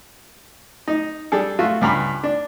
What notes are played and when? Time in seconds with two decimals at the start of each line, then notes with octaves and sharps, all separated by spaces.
0.88 D#4
1.32 G3 D4 G#4 A4
1.59 A3 F4 F#4
1.81 C#2 G2 A#5 B5
2.24 D4